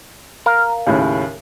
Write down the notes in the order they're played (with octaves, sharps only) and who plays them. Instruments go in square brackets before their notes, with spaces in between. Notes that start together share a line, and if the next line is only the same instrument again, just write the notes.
[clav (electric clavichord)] A#4 F5
[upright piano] D#2 A2 C#3